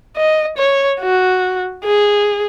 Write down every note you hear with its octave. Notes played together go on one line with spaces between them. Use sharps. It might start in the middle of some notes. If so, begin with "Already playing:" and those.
D#5
C#5
F#4
G#4